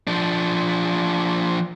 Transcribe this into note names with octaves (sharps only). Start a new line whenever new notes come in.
F3 D4